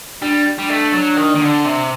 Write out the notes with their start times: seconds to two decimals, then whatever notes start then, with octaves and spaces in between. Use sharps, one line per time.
0.22 G3 D4
0.58 G3 D4
0.70 A3
0.93 F#3
1.17 D#3
1.35 D#3
1.41 D3
1.65 C3